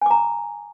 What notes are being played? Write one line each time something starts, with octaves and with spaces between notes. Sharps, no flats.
G#5 A#5 D6